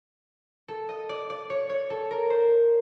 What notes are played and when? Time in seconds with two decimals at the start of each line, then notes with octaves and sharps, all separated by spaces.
0.68 A4
0.89 D#5
1.09 D5
1.30 D5
1.50 C#5
1.69 C#5
1.90 A4
2.11 A#4
2.30 C5